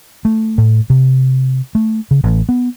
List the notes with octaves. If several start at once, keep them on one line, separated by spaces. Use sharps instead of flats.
A3
A2
C3
A3
C#3
A1
B3